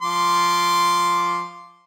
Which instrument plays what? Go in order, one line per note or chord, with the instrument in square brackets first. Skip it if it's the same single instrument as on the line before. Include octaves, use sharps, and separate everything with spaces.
[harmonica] F3 C6 D6